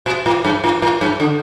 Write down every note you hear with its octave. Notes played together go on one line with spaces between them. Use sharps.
A#2
A2
G2
A2
A2
G2
D3